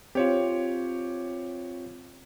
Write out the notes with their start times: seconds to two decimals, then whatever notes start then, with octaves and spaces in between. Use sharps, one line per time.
0.15 C4 F4 G4 C#5